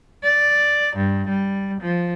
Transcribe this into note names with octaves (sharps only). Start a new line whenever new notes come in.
D5
G2
G3
F3